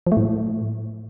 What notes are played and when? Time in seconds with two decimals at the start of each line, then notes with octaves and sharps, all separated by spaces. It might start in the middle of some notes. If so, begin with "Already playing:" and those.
0.07 F3
0.12 A3
0.17 A2